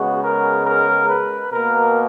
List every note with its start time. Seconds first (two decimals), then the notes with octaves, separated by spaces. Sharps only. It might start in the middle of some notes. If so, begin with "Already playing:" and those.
Already playing: C#3 G#3 B3 F#4
0.23 A#4
0.66 A#4
1.09 B4
1.52 B2 A#3 A#4